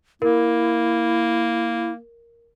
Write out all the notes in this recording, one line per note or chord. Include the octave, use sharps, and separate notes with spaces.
A#3 E4 A#4